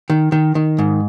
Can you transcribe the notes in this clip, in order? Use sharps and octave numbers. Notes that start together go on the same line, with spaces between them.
D#3
D#3
D#3
G#2